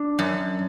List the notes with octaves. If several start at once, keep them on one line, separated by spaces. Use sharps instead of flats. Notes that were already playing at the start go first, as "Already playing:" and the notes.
Already playing: D4
F#2